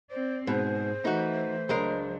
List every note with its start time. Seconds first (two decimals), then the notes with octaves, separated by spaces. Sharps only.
0.11 C4 C5 D5
0.47 G#2 B2 G#4 C5
1.05 E3 A3 D#4 F#4 B4
1.69 C#2 F#3 G#3 D4 A#4